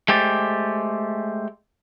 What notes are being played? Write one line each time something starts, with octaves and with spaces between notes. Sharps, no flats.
G#3 A3 G4 C5 D5